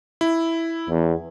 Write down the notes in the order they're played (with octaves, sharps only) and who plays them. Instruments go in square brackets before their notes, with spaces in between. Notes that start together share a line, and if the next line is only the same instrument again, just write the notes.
[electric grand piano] E4
[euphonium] E2